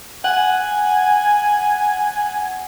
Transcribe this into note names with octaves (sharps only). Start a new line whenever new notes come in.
F#5 G#5